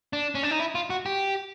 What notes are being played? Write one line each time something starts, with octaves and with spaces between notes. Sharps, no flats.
D4
C#4
D4
D#4
E4
F4
F#4
G4